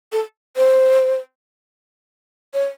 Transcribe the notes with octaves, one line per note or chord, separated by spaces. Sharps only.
A4
C5
C#5